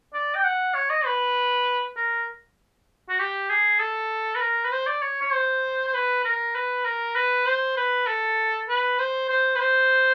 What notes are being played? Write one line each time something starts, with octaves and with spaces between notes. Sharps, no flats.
D5
G5
F#5
C#5
D#5
B4
A#4
F#4
G4
G#4
A4
B4
A#4
B4
C5
D5
C#5
C#5
C5
C5
B4
A#4
B4
A#4
B4
C5
B4
A4
B4
C5
C5
B4
C5